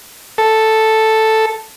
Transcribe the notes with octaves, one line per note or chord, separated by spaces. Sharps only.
A4